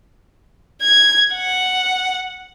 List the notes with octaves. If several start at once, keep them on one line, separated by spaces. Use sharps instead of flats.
G#6
F#5